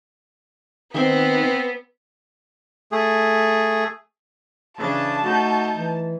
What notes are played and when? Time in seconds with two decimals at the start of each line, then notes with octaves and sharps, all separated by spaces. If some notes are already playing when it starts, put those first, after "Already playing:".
0.94 D#3 B3 C4
2.92 A3 G#4
4.78 C#3 E3 D4 A5
5.24 A3 D#4 F#4 G6
5.73 E3